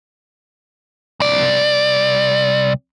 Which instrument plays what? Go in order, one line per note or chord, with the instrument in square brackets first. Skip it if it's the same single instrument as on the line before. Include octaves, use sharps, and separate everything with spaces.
[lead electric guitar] C2 D5